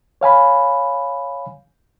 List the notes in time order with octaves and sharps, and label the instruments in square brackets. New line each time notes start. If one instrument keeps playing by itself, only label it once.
[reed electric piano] C#5 F5 G#5 B5